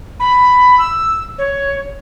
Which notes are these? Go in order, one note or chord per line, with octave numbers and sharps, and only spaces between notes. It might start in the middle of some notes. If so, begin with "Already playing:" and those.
B5
E6
C#5